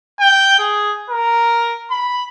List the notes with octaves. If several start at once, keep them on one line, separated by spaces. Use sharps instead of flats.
G5
G#4
A#4
B5